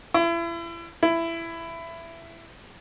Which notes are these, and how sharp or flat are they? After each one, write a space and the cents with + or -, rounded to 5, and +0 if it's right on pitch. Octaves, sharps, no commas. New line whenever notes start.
E4 +35
E4 +15